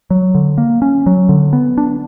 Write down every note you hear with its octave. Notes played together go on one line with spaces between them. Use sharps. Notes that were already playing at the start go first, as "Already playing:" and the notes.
F#3
D3
A#3
C#4
F#3
D3
B3
D4